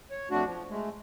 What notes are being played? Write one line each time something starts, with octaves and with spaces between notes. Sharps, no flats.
C#5
F2 A3 D4 F#4
F3
G#3 A3